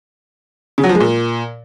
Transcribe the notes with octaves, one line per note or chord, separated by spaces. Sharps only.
C#3
F#3
F3
G#3
A#2